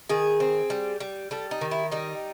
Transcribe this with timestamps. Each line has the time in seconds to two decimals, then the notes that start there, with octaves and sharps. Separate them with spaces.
0.09 D#3 G#4
0.40 C4
0.70 G3
1.00 G3
1.31 G3 A4
1.51 D#4
1.61 D#3
1.71 E4
1.92 G3 D#4